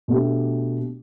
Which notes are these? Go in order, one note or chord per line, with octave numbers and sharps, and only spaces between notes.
B2 A3 D4 G4